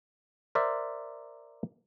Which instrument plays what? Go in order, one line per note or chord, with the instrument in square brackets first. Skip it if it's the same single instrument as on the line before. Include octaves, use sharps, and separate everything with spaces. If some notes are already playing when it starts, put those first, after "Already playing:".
[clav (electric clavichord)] A#4 C5 D5 E5